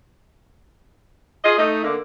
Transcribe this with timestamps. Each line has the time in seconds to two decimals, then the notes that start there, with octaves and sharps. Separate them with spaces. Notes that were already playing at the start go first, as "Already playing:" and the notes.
1.43 F4 G#4 D#5
1.57 A3 D#4
1.84 D3 A#3